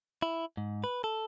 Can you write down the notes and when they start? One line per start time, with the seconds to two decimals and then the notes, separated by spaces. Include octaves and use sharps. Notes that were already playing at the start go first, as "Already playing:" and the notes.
0.22 E4
0.57 G#2
0.84 B4
1.04 A4